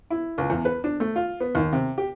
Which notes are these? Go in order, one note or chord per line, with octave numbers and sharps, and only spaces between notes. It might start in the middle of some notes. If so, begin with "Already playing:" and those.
E4
C#2
E2
B4
D4
A3
F4
B3
D#2
C3
G4